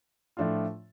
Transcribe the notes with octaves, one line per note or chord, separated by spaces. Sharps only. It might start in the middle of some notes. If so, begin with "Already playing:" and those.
A2 F3 A3 D4 F4